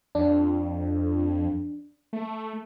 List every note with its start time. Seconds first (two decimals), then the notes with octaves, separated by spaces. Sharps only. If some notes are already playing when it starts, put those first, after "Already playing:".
0.15 F2 D4
2.13 A3